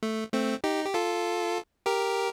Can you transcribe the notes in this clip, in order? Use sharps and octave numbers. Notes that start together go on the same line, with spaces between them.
A3
A3 C4
D#4 G4
G4
F4 A4
G4 A#4